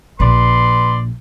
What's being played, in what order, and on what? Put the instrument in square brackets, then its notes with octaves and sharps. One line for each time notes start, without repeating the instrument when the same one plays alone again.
[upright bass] A#1 [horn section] B4 D5 C6